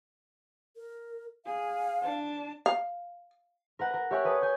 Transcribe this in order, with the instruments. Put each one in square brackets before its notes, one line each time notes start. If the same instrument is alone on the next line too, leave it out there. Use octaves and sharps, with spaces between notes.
[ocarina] A#4
[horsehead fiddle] G#4 [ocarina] F5
[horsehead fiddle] D4 A5
[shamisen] F5
[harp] A#4 B4 F#5
A#4
G4 C#5 E5 G#5 C#6 F#6
A4 B4 D#6 G#6
G#5 D#6 G6